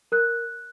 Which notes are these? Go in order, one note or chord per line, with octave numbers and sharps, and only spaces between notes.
A#4 F#6